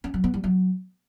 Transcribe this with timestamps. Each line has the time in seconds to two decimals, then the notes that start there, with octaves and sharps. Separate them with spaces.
0.04 C#4
0.14 F#3
0.24 B3
0.34 G3
0.44 F#3